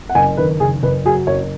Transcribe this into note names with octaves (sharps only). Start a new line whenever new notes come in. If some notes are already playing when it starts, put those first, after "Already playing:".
F#5
F#1 G#5
D#3 B4
F#1 G#4
F#1 B4
F#3 G#4
F#1 C#5